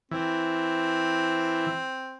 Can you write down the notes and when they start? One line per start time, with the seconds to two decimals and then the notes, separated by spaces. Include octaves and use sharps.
0.11 E3 C4